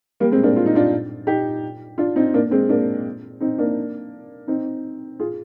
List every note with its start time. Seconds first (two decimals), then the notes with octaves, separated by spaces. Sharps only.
0.20 G3 A#3
0.31 G#3 C4
0.43 A#3 D4
0.56 F4
0.66 D#4
0.75 D4 F4
1.27 D#4 G4
1.98 D4 F4
2.16 C4 D#4
2.34 A#3 D4
2.51 G#3 C4
2.69 A#3 D4
3.40 C4 D#4
3.58 A#3 D4
4.48 C4 D#4
5.20 F4 G#4